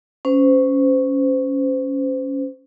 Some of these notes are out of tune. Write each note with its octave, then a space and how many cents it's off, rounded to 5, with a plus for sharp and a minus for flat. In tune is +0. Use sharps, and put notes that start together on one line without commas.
C#4 +0 C5 -30